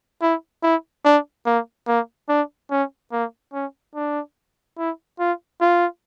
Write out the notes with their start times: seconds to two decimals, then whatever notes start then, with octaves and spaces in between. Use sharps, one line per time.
0.22 E4
0.63 E4
1.05 D4
1.46 A#3
1.87 A#3
2.29 D4
2.70 C#4
3.12 A#3
3.53 C#4
3.95 D4
4.78 E4
5.19 F4
5.61 F4